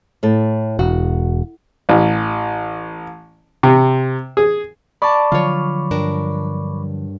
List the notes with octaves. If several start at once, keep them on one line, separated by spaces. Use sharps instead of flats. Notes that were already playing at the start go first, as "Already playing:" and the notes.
A2 A4
E1 F#4
A1
C3
G#4
D5 A5 B5 C#6 D6
D3 F3 F#3 F4 C#5
G2 D4 A#4